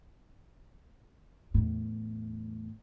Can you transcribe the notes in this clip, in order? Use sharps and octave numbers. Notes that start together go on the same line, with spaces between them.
E2 A2